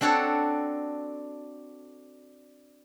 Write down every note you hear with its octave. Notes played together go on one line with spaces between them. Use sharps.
C4 D4 F#4 A4 C#5